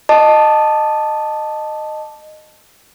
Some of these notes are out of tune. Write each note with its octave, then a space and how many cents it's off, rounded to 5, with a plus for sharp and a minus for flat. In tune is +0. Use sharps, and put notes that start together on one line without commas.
D#5 -15 A5 +0 D6 +0